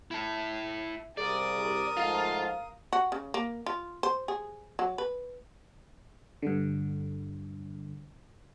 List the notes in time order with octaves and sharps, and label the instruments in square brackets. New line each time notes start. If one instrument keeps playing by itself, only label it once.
[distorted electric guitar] E4 A5 [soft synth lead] E5
[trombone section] C2 [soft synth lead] G#4 [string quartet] A#4 D#6 [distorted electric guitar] D5
[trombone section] G#2 F3 A3 [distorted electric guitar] F4 [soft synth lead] F5
[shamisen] F#4
C#3
A#3
F4
C5
G#4
F#3
B4
[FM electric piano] G2 D3